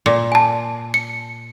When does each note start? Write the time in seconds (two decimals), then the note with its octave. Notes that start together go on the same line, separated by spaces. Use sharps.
0.06 A#2
0.32 G#5 A5
0.94 C#7